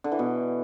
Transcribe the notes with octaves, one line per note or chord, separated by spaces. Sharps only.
D3
E3
B2